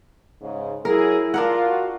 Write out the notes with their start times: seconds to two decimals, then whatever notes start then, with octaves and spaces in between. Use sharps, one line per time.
0.42 G#2 C#3
0.85 F#3 E4 G#4 A#4
1.34 D4 F4 A#4 F#5
1.66 F#4